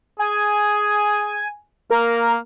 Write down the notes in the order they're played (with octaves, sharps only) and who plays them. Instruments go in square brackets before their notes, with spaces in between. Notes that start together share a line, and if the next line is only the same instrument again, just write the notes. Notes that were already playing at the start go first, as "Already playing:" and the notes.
[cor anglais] G#4 [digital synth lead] G#5
[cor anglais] A#3 [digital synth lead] A#4